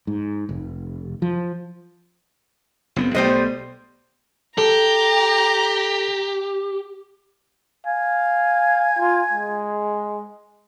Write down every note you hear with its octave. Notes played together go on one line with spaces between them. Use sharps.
G#2
F1
F3
F#1 B3 C4
B1 G3 A3 B3 C5 D#5
G4 A4 A#5
F5 G#5
F4
G#3